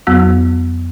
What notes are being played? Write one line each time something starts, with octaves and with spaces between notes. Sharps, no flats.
F2 F#3 B3 F#4 E6